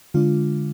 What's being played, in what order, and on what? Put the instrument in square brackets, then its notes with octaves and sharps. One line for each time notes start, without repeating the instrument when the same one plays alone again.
[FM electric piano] D3 G#3 D4 F4